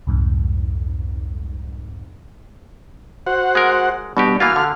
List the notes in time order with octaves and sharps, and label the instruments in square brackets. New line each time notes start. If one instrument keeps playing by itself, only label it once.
[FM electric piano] C2 F2 G#2
[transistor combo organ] F#4 C5 F#5
[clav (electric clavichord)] G#3 A#4
[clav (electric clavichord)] B2 F#4 G4 [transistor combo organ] G3 B3 D4
[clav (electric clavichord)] E3 A#3 F4 [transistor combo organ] F#4 F5 F6
[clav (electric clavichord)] D3